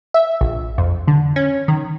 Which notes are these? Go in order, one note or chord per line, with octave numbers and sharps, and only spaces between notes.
E5
A#1
F2
D3
C#4
D#3